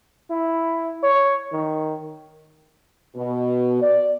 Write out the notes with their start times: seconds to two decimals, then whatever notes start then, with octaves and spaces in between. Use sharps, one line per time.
0.30 E4
1.03 C#5
1.52 D#3
3.16 B2
3.82 D5